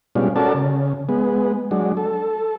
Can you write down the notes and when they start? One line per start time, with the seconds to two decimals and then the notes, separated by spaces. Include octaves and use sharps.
0.15 B2 G3 G#3 C#4 D4 F4
0.36 C#4 F#4 A4 A#4 D5 A5
0.54 C#3
1.09 G#3 B3
1.71 F#3 G#3 D4
1.97 A4